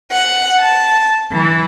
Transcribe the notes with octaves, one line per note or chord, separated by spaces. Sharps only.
F#5
A5
E3